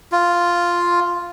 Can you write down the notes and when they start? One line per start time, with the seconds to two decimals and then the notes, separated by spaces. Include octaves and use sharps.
0.12 F4